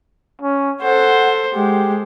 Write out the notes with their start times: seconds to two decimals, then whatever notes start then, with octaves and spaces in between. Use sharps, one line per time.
0.42 C#4
0.82 A4 C5 F#5
1.55 G#3 G4